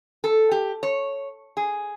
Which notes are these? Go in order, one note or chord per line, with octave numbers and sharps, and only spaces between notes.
A4
G4
C#5
G#4